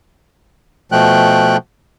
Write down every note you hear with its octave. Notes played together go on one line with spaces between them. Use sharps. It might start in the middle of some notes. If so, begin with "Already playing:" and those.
B2 F3 A3 G5 F#6